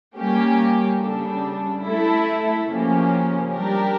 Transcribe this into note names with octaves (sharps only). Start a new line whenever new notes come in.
G3 A#3 C#4 G4
C#3 G3 D4 A4
A3 E4 A4
C#3 F3 A#3 C#4 G4
G3 D4 G4 A#4